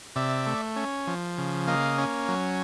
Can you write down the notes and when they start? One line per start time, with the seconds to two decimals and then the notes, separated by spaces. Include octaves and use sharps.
0.16 C3 D5 E5
0.46 A3
0.76 C#4
1.07 F3
1.38 C#3
1.67 A#3 D#5 F5
1.98 C#4
2.28 F#3